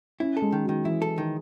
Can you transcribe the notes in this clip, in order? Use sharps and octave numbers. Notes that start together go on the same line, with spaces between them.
C#4 E4
A4
G#3
D#3
F#3
D#3
E3 E4
A4
D#3